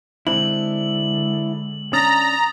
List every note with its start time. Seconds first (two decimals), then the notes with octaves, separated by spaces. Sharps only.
0.27 D3 G#3 C4 D4 E4 F#7
1.93 C#4 D4 A#5 D#6 A6